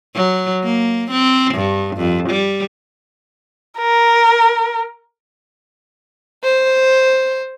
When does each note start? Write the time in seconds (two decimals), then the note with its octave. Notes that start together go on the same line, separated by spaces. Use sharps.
0.15 F#3
0.64 A#3
1.11 C4
1.54 G2
1.97 F2
2.29 G3
3.79 A#4
6.44 C5